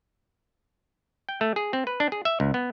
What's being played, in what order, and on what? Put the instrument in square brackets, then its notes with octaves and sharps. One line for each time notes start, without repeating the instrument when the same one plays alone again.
[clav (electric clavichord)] G5
A3
G#4
C4
B4
D4
G#4
E5
C#2
B3